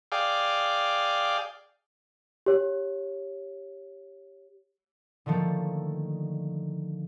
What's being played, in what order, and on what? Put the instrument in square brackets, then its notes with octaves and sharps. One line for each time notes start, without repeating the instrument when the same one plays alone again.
[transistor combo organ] G#4 D5 F5 G5
[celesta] G4 C#5
[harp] D3 D#3 F3 A3 A#3